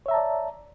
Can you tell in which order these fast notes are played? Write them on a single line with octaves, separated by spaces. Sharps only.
C#5 E5 A#5 A5 D5